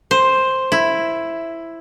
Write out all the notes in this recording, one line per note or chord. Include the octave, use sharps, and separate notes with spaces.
C5
E4